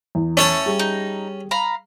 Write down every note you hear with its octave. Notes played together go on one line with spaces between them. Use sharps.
E2
A3 C#4 C#5 A5
G3 G#4
D#4
F5 A#5 B5